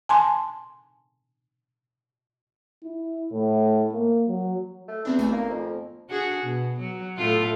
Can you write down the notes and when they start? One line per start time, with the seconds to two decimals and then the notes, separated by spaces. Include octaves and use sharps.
0.09 G#5 A5 C6
2.83 E4
3.32 A2
3.92 A#3
4.28 F#3
4.88 A3
5.05 E2 B3 C4 D4
5.19 G#1 A3 G#5
5.32 A#3
5.50 F2
6.10 D4 F#4 G#4
6.41 B2
6.79 F#3
7.17 A2 A3 F4